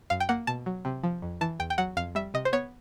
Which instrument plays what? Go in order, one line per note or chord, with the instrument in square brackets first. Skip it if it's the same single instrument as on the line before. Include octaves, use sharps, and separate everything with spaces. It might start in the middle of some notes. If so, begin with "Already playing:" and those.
[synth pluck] F#2 F5
G5
A#3 F#5
B2 A5
F#3
C3
F3
F2
E3 A5
E2 G5
G5
F#3 F#5
F2 F5
G3 E5
C3 D#5
C5
B3 C#5